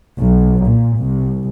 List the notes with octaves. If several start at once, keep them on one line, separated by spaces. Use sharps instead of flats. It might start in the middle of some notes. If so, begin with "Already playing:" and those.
B1
A#2
C2